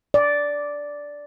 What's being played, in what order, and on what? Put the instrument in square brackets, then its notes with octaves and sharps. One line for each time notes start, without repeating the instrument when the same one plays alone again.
[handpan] D5